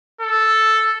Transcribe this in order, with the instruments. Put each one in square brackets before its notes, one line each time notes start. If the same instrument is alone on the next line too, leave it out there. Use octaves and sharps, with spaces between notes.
[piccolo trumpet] A4